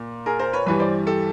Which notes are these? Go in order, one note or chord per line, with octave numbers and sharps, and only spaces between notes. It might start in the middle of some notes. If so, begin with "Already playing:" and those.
Already playing: A#2
G#4 A#4
A#4 C5
B4 C#5
G2 E3 G3 B4 C#5
C5 D5
G4 A4